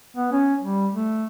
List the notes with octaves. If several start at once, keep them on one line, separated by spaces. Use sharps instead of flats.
B3
C#4
G3
A3